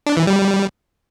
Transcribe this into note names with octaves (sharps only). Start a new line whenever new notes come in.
D4
E3
G3